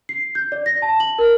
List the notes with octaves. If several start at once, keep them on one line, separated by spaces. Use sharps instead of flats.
C7
G6
D5
A#6
A5
F#7
A#4